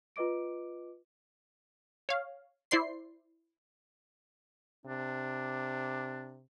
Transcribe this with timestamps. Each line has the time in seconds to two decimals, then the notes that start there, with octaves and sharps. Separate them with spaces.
0.16 F4 B4 D#5 D6 D7
2.09 C#5 F5
2.71 E4 C5 D5 C6 C7
4.86 C3 D4